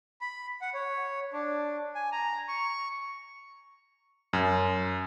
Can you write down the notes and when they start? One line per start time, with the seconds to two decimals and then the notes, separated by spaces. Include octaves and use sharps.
0.21 B5
0.61 F#5
0.74 C#5
1.33 D4
1.95 G#5
2.12 A#5
2.48 C#6
4.33 F#2